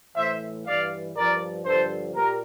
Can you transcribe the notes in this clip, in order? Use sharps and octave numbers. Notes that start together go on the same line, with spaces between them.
A2 E3 C5 E5
G2 E3 D5 F5
G2 F3 A#4 D5
G2 D3 F3 A4 C5
A#2 G4 A#4